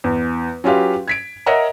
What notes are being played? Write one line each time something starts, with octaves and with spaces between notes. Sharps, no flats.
E2
F#3 C#4 F4 G4 B4 F5
G#6 B6 D7
A#4 C#5 D#5 E5 F#5 A#5